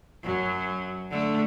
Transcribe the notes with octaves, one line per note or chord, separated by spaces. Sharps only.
F#2 F#3
D3 A3